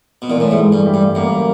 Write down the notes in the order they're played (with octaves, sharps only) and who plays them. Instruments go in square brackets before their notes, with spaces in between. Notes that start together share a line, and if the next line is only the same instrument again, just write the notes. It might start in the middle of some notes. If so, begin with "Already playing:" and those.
[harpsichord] B2
[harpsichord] A#2 [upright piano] E3
[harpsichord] A2
G#2
[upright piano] A2
[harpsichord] G2
[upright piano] G3
[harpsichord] G2
[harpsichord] F#2 [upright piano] A#3